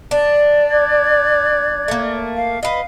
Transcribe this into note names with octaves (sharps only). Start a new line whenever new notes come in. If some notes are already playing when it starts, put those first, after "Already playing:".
D4 D5
D6 F#6 G#6
A3 A#3
F5
B4 D#5 F5